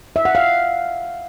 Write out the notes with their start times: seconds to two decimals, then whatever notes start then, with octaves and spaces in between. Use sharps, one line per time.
0.16 E5
0.25 F#5
0.35 F5